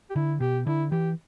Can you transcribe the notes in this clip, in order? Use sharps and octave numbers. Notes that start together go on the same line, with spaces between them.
G4
D3 E4
B2 G4
D3 E4
E3 G4